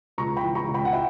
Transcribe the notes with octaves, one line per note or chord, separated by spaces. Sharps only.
C#2 A#5 C#6
G5 B5
E3
A#5 C#6
C#2
G5 B5
F#5
E5 G5